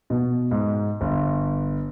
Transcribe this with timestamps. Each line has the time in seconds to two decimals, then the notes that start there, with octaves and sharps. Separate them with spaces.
0.10 B2
0.51 G#2
1.01 G1